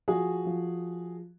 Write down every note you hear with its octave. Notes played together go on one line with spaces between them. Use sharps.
F3 F#4 G#4
F3